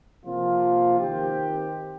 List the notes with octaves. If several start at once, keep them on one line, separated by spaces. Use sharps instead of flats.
C3 F3 A#3 F4
D#3 C4 G4